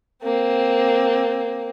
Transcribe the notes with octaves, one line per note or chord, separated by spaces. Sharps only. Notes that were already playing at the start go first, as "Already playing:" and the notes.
A#3 C4